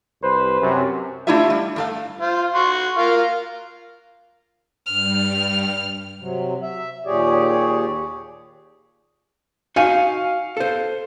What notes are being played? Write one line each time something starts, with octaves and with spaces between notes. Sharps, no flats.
C2 B4 C5
F#2 C3
A3 D4 E4 F4 G4 E5
G3
G2 A3 F5
F4 C5
F#4 C6
F4 A#4
G2 G3 F6
C3 F#3
E5
D#2 A#2 G4 G#4 C#5 D5
D#4 F#4 F5 G#5
A4 C5